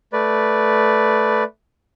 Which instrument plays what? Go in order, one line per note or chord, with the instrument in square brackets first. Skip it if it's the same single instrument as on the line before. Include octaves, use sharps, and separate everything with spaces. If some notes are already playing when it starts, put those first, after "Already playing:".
[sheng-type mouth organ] A3 B4 D5